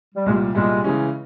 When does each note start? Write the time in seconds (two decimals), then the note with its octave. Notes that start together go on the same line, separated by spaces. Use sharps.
0.15 G3
0.26 C2 A#2 G3 G#3
0.55 C2 A#2 G3 G#3
0.84 C#3 E3 G#3 C#4